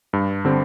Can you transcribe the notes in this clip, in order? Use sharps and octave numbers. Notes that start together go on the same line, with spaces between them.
G2
D3 G3 C4